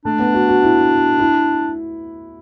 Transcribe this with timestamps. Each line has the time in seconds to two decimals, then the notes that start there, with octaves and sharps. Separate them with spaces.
0.05 A3 D4
0.19 B3
0.34 F#4
0.49 F#4
0.63 E4
1.19 E4